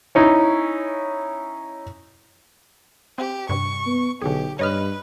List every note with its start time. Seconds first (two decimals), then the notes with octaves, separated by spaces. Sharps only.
0.15 C#4 D#4 E4
3.18 C4 G4
3.49 G2 C3 C#6
3.86 B3
4.22 B1 D3 G4 G#4
4.59 G2 B4 C#5 D#5 F6